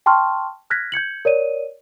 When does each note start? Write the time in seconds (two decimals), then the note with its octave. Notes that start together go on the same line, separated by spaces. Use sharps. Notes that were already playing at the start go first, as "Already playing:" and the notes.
0.06 G5 A5 C6 C#6 F6
0.70 F6 F#6 G#6 A#6 B6
0.92 G6 G#6 C#7 F#7
1.25 A#4 C#5 D5 D#7